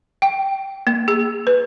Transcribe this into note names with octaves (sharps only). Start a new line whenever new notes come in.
G5
A#3
G#4
B4